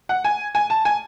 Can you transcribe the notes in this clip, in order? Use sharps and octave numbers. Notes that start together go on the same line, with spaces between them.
F#5
G#5
G#5
A5
G#5